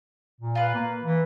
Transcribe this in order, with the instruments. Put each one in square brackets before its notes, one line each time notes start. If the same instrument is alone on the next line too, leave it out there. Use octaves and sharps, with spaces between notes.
[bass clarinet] A#2
[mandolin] F4 B4
[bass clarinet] A#3
E3